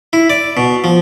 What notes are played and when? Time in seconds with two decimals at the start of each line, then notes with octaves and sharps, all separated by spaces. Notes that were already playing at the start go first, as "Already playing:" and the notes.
0.13 E4
0.30 D5
0.57 B2
0.84 F3